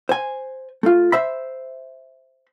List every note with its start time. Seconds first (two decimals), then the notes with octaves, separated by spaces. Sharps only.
0.09 C5 G#5
0.83 A3 F4
1.12 C5 E5 B5